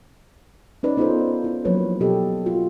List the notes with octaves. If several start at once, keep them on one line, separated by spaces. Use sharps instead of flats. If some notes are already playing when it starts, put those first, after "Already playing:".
C#4 D#4 B4 D5
B3 D#4 F4 A4 A#4 C5
E4
F3 F#3 A#3 B4 C#5
B2 C4 G4 A4 D#5
F4 F#4